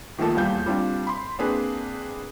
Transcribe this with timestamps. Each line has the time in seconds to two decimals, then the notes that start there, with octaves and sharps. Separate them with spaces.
0.18 D#3 F3 A3 A#3 A4
0.35 D#1 E2 G3 F5 G6
0.66 G3 C4 D4 F4
1.07 B5 C6
1.39 A#3 C4 D4 G#4 B4